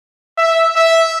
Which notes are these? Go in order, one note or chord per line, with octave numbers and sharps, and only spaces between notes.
E5
E5